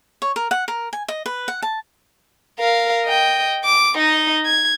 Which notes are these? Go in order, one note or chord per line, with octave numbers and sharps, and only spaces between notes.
C#5
A#4
F#5
A#4
G#5
D#5
B4
F#5
A5
A#4 F5
D#5 G5
D6
D#4 D#5
G#6